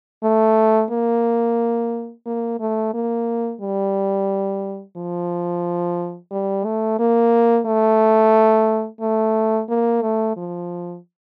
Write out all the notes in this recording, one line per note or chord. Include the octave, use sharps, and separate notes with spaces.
A3
A#3
A#3
A3
A#3
G3
F3
G3
A3
A#3
A3
A3
A#3
A3
F3